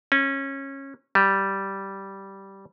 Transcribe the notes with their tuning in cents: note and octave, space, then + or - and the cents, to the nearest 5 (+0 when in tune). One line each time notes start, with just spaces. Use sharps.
C#4 -20
G3 -10